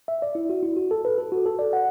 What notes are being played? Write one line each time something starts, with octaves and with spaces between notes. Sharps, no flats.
E5
D5
E4
F#4
E4
F#4
A4
B4
A4
F#4
A4
D5
F#5